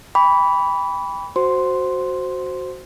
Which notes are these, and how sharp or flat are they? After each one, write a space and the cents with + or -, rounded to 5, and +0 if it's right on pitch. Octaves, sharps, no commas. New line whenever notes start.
G5 +30 B5 +0 D6 -45
F#4 +0 C5 +0 C6 +0